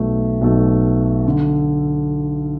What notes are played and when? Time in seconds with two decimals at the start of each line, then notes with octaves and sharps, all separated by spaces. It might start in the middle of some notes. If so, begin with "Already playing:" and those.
Already playing: B1 B2 F#3 A3
0.41 B1 B2 F#3 A3
1.27 D3